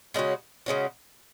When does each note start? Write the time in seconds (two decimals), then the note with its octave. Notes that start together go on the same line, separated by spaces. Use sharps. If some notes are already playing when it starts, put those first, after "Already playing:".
0.14 C#3 G#3 C#4 F#4
0.66 C#3 G#3 C#4 F#4